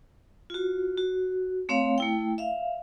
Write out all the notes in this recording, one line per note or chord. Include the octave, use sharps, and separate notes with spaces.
F4 F#4
F#4
A3 C4 C#5 F5
A3 E4 G5
E5 F5